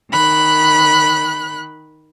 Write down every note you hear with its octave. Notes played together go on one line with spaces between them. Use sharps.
D#3 B5 F#6